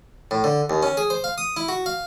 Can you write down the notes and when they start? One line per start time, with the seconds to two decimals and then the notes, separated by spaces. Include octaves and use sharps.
0.31 A2
0.44 D3
0.70 D#2
0.83 C#4
0.97 G#4
1.10 C5
1.24 F5
1.38 D#6
1.57 E4
1.69 F#4
1.86 F5